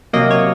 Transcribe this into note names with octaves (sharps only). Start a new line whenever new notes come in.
C3 F#3 A#3 D#5
C#5